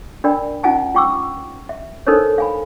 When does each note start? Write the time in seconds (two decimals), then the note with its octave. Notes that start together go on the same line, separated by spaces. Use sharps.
0.24 D4 A#4 D5 G5 B5
0.63 C#4 D#4 F4 F#5 G#5 A5
0.94 F4 G5 C#6 D6 E6
1.69 E5
2.07 D4 D#4 A4 A#4 C5 C#5
2.38 F5 G#5 B5